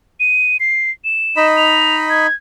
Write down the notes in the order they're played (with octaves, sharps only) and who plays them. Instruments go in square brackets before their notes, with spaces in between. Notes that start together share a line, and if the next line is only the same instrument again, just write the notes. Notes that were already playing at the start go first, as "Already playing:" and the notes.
[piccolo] D#7
C7
E7
[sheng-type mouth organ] D#4 D#5 B5
[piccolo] F7
G#6